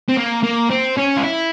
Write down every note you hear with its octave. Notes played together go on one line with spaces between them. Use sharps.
C4
A#3
A#3
C4
C#4
F4
E4